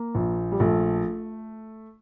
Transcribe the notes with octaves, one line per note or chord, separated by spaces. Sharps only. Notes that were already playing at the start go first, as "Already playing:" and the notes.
Already playing: A#3
A#1
G3
A#1 A3